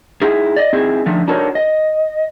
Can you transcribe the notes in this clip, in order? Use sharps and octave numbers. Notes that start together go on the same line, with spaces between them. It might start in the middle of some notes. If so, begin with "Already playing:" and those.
D#4 E4 G#4
D5 D#5
C4 D#4 E4 G#4
D3 F3 A3 D#4
D4 D#4 F#4 A4 A#4 C#5
D#5